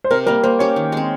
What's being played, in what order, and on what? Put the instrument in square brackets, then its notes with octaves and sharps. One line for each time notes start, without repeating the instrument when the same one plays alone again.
[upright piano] C5
[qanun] C3 [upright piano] A#4
[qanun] G3 A#3 [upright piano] A#4
[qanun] A#3 [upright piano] C5
[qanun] C#4 G4 [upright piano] C#5
[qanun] D#3
G#3 C4